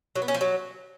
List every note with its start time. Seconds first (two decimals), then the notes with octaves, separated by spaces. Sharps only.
0.16 F#3
0.22 B3
0.28 C#4
0.35 F3
0.41 F#3